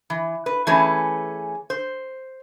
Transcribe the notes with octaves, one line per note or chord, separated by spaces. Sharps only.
E3
B4
E3 A3 C#4 G#4 B4
C5